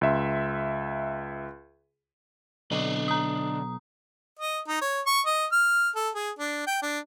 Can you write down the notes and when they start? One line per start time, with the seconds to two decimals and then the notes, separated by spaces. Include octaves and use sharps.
0.01 C#2 E5 C6
2.71 B1 D3 D4 D#5
3.08 A#5 D#6
4.39 D#5
4.68 D#4
4.81 C#5
5.06 C#6
5.26 D#5
5.52 F6
5.95 A4
6.15 G#4
6.38 D4
6.67 G5
6.82 D4